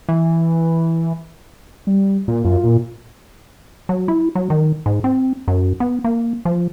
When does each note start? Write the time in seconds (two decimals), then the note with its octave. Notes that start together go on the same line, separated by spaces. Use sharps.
0.09 E3
1.87 G3
2.28 A#2 A#3
2.45 F#2 F4
2.64 A#2
3.89 F#3
4.08 E4
4.35 F#3
4.50 D#3
4.86 G#2
5.04 C4
5.48 F#2
5.80 B3
6.04 A#3
6.45 F3